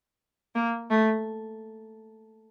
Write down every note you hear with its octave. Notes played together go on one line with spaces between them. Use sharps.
A#3
A3